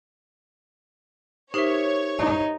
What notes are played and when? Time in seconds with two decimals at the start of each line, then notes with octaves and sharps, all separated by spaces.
1.54 D#4 G4 A#4 C5 C#5 E5
2.19 D#4 D#5